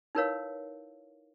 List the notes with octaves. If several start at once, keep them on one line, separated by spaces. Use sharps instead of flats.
D#4 E4 A#4 B4 C#5 F5